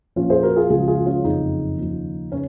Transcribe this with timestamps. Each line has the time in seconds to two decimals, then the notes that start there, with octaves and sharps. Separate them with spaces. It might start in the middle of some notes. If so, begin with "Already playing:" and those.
0.16 A#1 A#2 F3 C#4 F4
0.30 G#4 C5
0.43 F#4 A#4
0.56 F4 G#4
0.70 C#2 C#3 F3 F4 G#4
0.88 F4 G#4
1.06 C#4 F4
1.24 F#1 F2 C#3 F3 D#4
1.78 D#2 C#3 F3
2.32 C#3 C#4